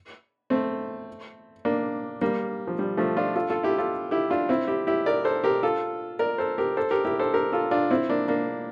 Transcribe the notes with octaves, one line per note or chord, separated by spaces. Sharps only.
A3 C4
A#3 D4
G3 A#3
F3
G3
F3 A3
D4 F4
F4 A4
F4 A4
E4 G4
F4 A4
E4 G4
D4 F4
C4 E4
E4 G4
E4 G4
A#4 D5
A4 C5
G4 A#4
F4 A4
A#4 D5
A4 C5
G4 A#4
A4 C5
G4 A#4
E4 G4
A4 C5
G4 A#4
F4 A4
D4 F4
C4 E4
A#3 D4
A#3 D4